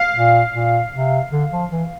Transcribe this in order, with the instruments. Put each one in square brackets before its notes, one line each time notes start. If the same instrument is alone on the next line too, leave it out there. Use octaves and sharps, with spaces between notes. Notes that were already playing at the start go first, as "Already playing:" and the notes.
Already playing: [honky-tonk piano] F5
[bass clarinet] A#2
A#2
C3
D3
F3
E3